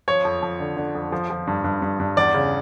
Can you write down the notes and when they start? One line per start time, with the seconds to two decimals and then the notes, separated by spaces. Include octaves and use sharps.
0.08 F3 C#5
0.25 F2
0.43 F2
0.60 D3
0.77 D3
0.95 F2
1.12 F3
1.30 F3
1.47 G2
1.64 G2
1.82 G2
2.00 G2
2.17 E2 D5
2.34 C#3